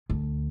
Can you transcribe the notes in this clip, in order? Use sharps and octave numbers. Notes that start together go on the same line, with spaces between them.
D2